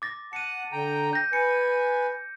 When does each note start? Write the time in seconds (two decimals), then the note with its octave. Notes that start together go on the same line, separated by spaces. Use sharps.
0.02 D6 A6 A#6
0.33 F#5 A5 C#7 D#7
0.72 D3 G5 A#5
1.13 G6 A#6
1.33 B4 G#5 C#7